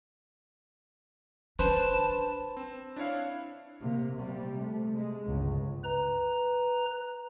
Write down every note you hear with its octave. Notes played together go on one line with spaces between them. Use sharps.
D4 B4 C5 A5
C4
D4 E4 C#5 F5
C3 A#3
C3 G3
C3 A3
G#3
G1 C#2
B4 A#5